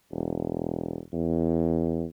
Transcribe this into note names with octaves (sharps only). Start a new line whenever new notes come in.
E1
E2